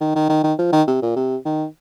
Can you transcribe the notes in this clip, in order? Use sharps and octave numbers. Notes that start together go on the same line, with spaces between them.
D#3
D#3
D#3
D#3
F3
D#3
C3
A#2
C3
D#3